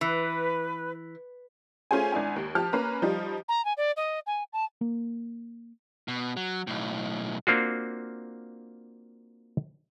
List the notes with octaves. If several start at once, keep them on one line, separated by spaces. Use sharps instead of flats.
E3 B4
A3 C#4 F4 G#4 C5 G#5
G#1 D4 E4 G#5
D#2
F3 G4 A5 F6
A#3 C#4 B4 A#5
F3 G3 D#4 F4
A#5
G#5
D5
D#5
G#5
A5
A#3
B2
F#3
B1 A2
A#3 C4 D4 F4 F#4